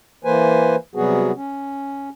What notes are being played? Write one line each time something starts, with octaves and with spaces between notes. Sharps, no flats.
E3 A#3 B4 C5 G#5
C3 F#3 G3 B3 F#4 G#4
C#4